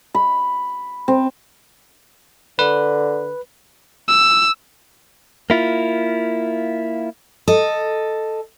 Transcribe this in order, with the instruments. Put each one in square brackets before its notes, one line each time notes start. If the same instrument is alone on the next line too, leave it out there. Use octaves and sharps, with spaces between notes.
[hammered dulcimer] B5
C4
[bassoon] D3 [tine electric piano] B4
[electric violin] E6
[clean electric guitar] A#3 E4 F4
[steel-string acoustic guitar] A4 D#5